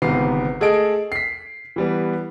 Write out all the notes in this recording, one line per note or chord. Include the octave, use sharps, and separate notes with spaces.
G1 G#2 C3 D#3 B3 C7
A3 G#4 A4 D#5 D7
B6 C7
E3 G3 B3